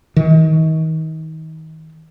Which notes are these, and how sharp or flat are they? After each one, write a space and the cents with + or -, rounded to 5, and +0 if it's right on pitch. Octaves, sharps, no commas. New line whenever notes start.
D#3 +35